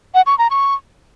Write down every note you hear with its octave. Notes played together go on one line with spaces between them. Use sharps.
F#5
C#6
A#5
C#6